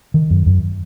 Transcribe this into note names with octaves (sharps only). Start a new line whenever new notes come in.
D#3
F#2
F#2